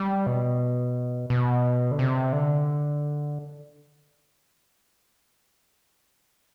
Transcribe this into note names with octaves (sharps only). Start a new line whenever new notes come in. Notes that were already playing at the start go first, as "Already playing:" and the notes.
Already playing: G3
B2
B2
D3
C3
D3